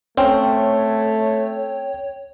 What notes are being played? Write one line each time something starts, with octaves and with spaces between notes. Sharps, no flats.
A3 C4 C#4 C#5 G5